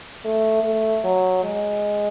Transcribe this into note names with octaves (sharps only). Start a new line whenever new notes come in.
A3
A3
F#3
G#3